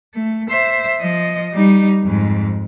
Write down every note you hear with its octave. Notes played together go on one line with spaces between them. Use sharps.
A3
C5 E5
F3 D#5
G3 D#4
F2 G#2